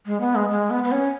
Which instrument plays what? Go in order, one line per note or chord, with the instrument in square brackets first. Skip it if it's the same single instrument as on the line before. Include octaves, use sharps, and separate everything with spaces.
[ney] G#3
B3
G#3
G#3
B3
B3
C#4